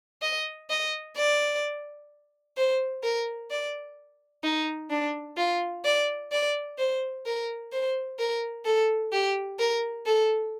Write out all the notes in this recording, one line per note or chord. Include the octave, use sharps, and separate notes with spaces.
D#5
D#5
D5
C5
A#4
D5
D#4
D4
F4
D5
D5
C5
A#4
C5
A#4
A4
G4
A#4
A4